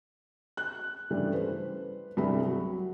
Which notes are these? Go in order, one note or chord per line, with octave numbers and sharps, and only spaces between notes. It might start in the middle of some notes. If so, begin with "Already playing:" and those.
F#6
G2 C#3 E3 G3 A3
B4 C5
C2 G2 G3 G#4 B5
F#3